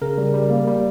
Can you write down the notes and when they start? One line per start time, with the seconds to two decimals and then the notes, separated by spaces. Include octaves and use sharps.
0.02 C#3 A#4
0.18 G3
0.34 G3
0.50 A#3
0.67 G3